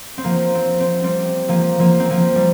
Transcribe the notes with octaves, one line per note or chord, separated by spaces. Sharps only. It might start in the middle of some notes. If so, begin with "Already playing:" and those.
C4
F3 A#3
C4
C4
G3 C4
F3 A#3
F3 A#3
C4
F3 A#3
G3